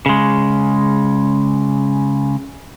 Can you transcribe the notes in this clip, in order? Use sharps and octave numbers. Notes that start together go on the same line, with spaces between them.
C#3 G#3